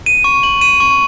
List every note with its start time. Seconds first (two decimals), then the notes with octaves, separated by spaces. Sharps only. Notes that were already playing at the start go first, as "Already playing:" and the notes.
0.06 D#7
0.24 C#6
0.43 F#7
0.61 D#7
0.80 C#6